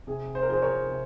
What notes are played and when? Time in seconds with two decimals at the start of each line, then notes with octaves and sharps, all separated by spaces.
0.07 C3 G#4
0.35 C5
0.42 A#4
0.48 F3 G#4 C5
0.62 A#4 C#5
0.90 C3